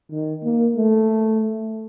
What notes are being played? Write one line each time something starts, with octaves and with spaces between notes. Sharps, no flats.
D#3
A#3
A3